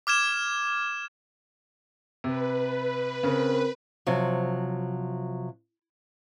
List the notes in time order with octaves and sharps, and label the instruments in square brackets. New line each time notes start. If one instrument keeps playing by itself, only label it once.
[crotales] D6 F6 G#6 E7
[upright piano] C3 [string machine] B4
[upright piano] C#3 [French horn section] C4 A#4
[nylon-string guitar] C3 F3 F#3